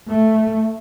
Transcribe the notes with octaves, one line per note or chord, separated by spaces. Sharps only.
A3